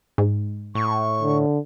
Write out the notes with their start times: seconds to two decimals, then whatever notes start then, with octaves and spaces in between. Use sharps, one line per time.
0.18 G#2
0.75 A2 C#6
1.22 D3